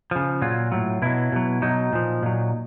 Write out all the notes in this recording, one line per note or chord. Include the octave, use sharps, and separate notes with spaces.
C#3 F3
A#2 F#3 F4
A2 F#3
B2 F#3 E4
B2 F#3
B2 F#3 D#4
A#2 F3
A#2 F#3